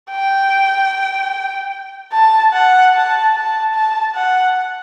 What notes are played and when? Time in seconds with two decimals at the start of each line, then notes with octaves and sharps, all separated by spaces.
0.11 G5
2.12 A5
2.53 F#5
2.94 A5
3.35 A5
3.74 A5
4.15 F#5